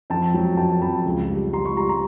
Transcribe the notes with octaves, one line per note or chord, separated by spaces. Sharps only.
F2 G5 A5
F#3
F2 G5 A5
F2 A5 B5
C#2
G3
G3 A#5 C6
B5 C#6
G3 A#5 C6
A#5 C6